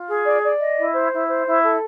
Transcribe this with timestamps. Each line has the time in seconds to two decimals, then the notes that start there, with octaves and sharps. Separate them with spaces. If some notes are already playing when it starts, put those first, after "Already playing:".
Already playing: F4
0.08 G#4
0.26 D5
0.43 D5
0.60 D#5
0.77 E4
0.94 C5
1.12 E4
1.29 C5
1.46 E4
1.63 A4